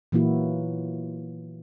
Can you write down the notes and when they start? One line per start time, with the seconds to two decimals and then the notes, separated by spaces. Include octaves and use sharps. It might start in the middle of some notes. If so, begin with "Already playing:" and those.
0.12 A#2 E3 F#3 A#3 E4 F#4